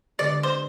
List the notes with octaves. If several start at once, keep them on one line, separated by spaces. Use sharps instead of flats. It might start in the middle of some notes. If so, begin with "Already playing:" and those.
D3 G#3 B3 D4 D5
C5